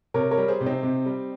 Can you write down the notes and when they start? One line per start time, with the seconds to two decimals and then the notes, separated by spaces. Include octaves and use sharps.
0.14 C3 A#4 C#5
0.31 A#4 C#5
0.38 G3
0.48 G#4 C5
0.61 C3
0.66 C4 D#4
0.83 C3
1.06 G3